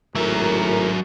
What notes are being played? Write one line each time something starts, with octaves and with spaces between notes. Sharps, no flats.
G#1 A2 F#3 A#4 E5